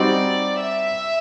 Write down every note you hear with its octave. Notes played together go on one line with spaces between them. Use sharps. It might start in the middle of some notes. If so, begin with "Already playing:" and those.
Already playing: G3 C4 D#4 F#4 D5
E5